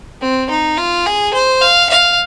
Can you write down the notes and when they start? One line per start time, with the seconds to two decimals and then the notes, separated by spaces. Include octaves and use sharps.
0.21 C4
0.50 D#4
0.78 F4
1.06 G#4
1.34 C5
1.61 F5
1.90 F5